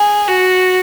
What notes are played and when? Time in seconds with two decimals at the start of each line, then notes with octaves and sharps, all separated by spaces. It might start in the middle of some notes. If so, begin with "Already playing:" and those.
Already playing: G#4
0.27 F#4